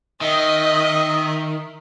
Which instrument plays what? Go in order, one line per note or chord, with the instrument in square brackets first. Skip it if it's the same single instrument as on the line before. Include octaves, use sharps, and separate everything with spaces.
[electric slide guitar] D#3 [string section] D#5 [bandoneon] E5 [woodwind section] D#6